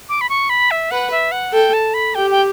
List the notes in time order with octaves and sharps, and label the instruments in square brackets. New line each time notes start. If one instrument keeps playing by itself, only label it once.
[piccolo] D6
B5
C#6
B5
E5
[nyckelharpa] B4 [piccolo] F#5
[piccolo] E5
F#5
[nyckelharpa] A4 [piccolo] G5
[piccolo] A5
B5
[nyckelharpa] G4 [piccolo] G5
[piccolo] G5